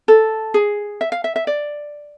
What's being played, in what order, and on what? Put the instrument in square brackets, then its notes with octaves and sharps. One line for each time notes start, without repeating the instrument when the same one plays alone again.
[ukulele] A4
G#4
E5
F5
E5
E5
D5